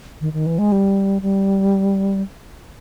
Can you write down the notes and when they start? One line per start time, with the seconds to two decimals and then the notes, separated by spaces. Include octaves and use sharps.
0.21 D#3
0.33 D#3
0.46 E3
0.58 G#3
0.72 G3
1.22 G3